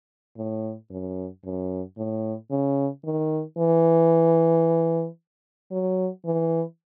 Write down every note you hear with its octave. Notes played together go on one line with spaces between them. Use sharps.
A2
F#2
F#2
A2
C#3
D#3
E3
F#3
E3